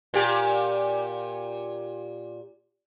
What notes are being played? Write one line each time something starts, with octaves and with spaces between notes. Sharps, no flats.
A#2 G4